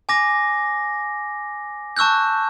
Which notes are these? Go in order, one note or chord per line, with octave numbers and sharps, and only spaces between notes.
G#5 D6 A#6
A5 C#6 E6 F#6 G6